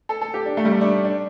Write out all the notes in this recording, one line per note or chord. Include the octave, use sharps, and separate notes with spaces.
A4
A4
G4
D4
A3
G3
A3
D4
D4